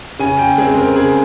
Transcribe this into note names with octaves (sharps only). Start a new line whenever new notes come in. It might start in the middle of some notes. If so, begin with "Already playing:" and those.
C#3 G#5
G5
G#3 C4 G#4
A#4
C#3 G#4